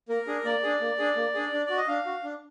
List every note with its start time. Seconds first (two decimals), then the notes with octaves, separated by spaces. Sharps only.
0.09 A#3 A#4
0.27 D4 G#4
0.45 A#3 D5
0.63 D4 G#4
0.81 A#3
0.98 D4 G#4
1.16 A#3
1.34 D4 G#4
1.52 D4
1.66 F#4 D5
1.77 D#5
1.88 D4 F5
2.06 F#4
2.24 D4